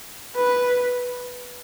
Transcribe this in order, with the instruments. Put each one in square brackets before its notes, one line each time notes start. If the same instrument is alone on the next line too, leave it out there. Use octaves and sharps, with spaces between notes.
[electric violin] B4